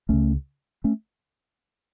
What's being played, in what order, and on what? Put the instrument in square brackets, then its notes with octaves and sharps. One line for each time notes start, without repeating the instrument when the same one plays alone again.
[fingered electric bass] C#2 C#3 A3 C#4
A3 C#4